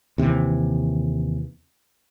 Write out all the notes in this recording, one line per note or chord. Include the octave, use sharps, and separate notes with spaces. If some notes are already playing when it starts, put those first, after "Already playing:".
D#2 C3 E3